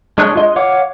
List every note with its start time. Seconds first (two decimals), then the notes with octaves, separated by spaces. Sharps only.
0.18 G#3 D4 G#4 C#5 F#6
0.35 F4 D#5
0.56 C#5 F5 F#5 D6